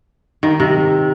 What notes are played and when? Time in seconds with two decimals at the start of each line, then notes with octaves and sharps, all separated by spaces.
0.43 D#3
0.60 C3